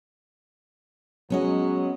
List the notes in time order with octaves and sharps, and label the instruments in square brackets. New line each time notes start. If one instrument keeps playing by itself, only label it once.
[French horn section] F#3 G#3 [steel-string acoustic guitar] B3 C#4 D#5